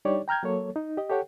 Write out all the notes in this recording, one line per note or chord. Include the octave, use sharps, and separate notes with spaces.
G3 D4 D#4 G4 C#5 D5
G5 A#5 F6 G6 G#6
F#3 A#3 A4 C#5
D#4
G4 D#5
G4 A4 C#5 F#5 G5